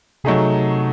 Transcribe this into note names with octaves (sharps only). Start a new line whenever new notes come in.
C3 F#3 A3 D#4 G#4